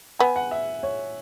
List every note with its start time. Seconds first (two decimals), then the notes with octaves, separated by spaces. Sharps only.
0.19 B3 G#5
0.36 F#5
0.51 E5
0.83 C#5